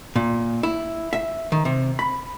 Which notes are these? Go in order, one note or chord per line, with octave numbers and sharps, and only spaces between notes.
A#2
E4
E5
D#3
C3
B5